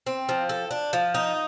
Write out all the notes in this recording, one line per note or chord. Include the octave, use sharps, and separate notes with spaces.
C4
F3
A4
D4
F3
D#4